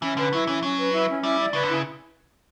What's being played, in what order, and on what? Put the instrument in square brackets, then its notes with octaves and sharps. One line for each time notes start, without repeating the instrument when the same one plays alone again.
[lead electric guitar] E3 [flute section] C#4
[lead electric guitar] D3 [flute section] B4
[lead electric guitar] F#3 [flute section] E4
[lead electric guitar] E3 [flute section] C#4
[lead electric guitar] F#3 [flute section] C#4
[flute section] B4
E4
C#4
[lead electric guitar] G3 [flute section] E4
[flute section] D5
[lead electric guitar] C#3 [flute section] B4
[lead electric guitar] D3
[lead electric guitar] C#3 [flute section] E4